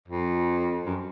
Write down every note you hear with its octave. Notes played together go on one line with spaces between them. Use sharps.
F2
F#2